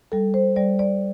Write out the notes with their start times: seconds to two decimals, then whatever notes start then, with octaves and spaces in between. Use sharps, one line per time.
0.12 G3 A4
0.34 C5
0.56 G3 D5
0.79 D5